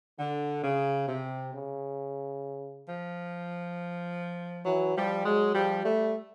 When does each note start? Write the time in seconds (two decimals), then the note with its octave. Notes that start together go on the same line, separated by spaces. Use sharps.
0.19 D3
0.64 C#3
1.08 C3
1.53 C#3
2.87 F3
4.65 E3 F#3
4.96 F3 G3
5.26 F#3 G#3
5.55 F3 G3
5.85 G3 A3